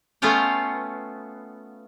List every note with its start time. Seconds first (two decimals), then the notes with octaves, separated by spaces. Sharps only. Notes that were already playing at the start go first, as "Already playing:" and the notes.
0.22 A3 B3 C#4 F4 F5 G5